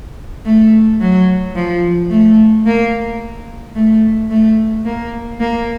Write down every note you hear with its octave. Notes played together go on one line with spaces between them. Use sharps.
A3
F#3
F3
A3
A#3
A3
A3
A#3
A#3